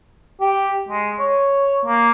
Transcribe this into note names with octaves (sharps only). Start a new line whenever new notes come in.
G4
G#3
C#5
A#3